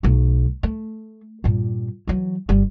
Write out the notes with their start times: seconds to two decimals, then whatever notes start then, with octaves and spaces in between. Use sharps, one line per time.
0.03 B1 A3
0.63 A3
1.44 G2 A#2
2.07 E3 F#3
2.49 G1 G3